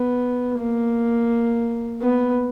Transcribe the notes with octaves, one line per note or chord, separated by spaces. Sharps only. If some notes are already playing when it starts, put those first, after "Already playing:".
Already playing: B3
A#3
B3